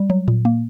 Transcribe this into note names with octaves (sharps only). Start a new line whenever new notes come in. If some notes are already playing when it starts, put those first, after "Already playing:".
Already playing: G3
F#3
A#2
A#3